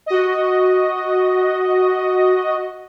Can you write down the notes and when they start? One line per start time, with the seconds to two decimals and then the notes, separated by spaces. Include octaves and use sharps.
0.06 F#4 D#5